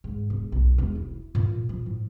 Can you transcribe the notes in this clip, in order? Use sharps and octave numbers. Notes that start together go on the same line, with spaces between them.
G#2
E1
B1
E1
E4
A#2
F3
A2